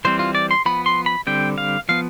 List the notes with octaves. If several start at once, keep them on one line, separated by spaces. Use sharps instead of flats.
E3 G3 C4 C5
F4
D5
C6
F3 B3 B5
C6
B5
D3 G3 C4 G5
F5
F3 B3 F5